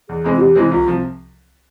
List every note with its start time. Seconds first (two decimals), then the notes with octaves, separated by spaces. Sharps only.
0.09 E2 G#4
0.24 C3 E3 G#3 C4
0.35 F4
0.40 E2 G4
0.55 C3 E3 G#3 C4 E4
0.71 C2 F4
0.86 C3 F3